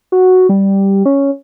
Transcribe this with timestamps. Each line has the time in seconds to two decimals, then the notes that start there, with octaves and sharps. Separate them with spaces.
0.12 F#4
0.49 G3
1.05 C#4